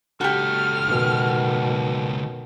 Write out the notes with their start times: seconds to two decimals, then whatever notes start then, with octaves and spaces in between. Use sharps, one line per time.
0.21 C#2 F#4 G4 A4 F6
0.85 B2 D#3